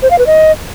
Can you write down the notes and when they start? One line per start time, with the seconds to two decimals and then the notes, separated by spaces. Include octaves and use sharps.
0.02 C5
0.10 F5
0.19 B4
0.27 D#5